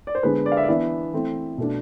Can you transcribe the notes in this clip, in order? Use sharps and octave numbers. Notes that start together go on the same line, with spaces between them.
D5
C5
D3 G#3 B3 D4 B4
D5
F5
E5
D5
E3 B3 D4 E5
E3 A3 C4
B2 A3 D4